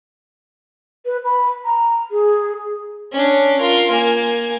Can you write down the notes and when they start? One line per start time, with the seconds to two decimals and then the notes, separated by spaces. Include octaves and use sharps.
1.06 B4
1.25 B5
1.65 A#5
2.11 G#4
3.12 C#4 D4
3.59 F4 A#4
3.91 A#3 G#5